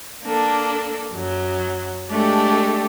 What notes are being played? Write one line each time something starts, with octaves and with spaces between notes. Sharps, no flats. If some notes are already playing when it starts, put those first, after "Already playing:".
A#3 D4 A4
F#2 F#3
G#3 A3 D4 G4 A4